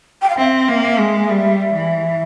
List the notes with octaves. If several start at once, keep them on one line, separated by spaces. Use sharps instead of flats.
G5
F5
C4 E5
A#3
G#3
G3
E3